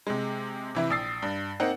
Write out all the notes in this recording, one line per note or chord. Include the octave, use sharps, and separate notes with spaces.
C3 G#3
C3 E3 E4
A#1 D#6 E6 A6 C7
G2
A#3 C4 D#4 C5 F#5